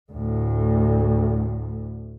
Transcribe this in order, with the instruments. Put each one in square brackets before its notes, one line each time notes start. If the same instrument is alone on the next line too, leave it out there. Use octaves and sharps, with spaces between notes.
[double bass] D2 A2